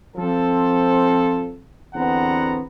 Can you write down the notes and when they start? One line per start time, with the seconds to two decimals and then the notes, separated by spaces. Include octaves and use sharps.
0.17 F3 C4 A4
1.95 E2 D3 B3 C4 F#5 A#5